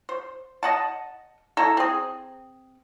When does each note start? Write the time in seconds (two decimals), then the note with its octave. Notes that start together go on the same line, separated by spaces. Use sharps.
0.09 C5
0.63 D#5 F#5 A5
1.57 E4 A4 A#5
1.77 C4 G#4